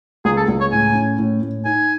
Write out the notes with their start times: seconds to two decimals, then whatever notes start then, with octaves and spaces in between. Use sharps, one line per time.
0.25 C#2 G#4
0.37 A4
0.48 C#2
0.61 C#5
0.72 A2 G#5
0.95 C#4
1.19 A2
1.42 A2
1.65 D#4 G#5